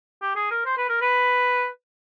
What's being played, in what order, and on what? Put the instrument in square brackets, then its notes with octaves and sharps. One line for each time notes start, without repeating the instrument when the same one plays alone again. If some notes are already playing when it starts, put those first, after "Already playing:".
[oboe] G4
G#4
A#4
C5
B4
A#4
B4